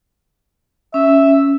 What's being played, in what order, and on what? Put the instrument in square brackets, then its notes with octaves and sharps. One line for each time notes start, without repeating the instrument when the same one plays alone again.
[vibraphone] C#4 [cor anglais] E5